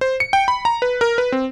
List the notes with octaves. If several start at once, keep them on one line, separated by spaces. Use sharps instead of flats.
C5
C#7
G5
B5
A#5
B4
A#4
B4
C4